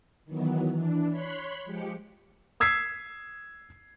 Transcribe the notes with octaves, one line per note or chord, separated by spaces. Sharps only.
D#3 E3 F#3 B3
E3 D4
C#5 B5 C6 F#6
F3 G#3 G4 C#7
D#6 E6 G#6 B6 C7